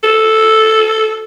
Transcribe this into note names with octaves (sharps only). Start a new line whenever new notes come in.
A4